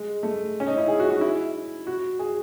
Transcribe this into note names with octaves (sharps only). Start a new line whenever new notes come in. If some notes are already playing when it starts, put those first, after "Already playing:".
Already playing: G#3
A3
C#4
D#4
E4
G#4
F#4
F#4
E4
F#4
G#4